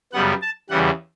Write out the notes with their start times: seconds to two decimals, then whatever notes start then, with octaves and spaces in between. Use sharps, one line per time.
0.13 F#2 C#3 G3 B3 F#5
0.42 A5
0.70 E2 C#3 E3 G3 F#5